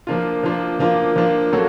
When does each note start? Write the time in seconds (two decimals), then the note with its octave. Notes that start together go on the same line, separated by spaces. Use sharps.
0.07 F3 A#3 D4 F4
0.44 F3 A#3 D4 F4
0.80 F3 A#3 D4 F4
1.16 F3 A#3 D4 F4
1.52 F#3 A#3 C#4 F#4 A4